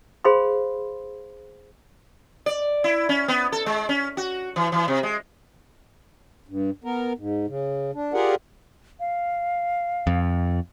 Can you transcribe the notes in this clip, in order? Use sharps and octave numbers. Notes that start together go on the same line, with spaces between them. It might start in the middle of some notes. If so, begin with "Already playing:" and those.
G#4 C5 F5 B5 C6
D5
E4
C#4
B3
A4
G#3
C#4
F#4
E3
E3
C3
G#3
G2
B3 A#4
G#2
C#3
D4
F4 G4 G#4 A#4 D5 F#5
F5
F2